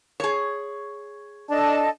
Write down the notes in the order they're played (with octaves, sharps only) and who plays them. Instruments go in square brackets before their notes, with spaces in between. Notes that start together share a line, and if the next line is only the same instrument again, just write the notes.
[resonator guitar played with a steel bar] G#4 C#5
[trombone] D4 [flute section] A4 D#5 A5